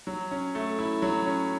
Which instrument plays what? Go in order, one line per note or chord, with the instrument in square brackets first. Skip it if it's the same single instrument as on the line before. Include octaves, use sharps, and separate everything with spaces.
[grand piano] F#3
C#4
A3
E4
F#3
C#4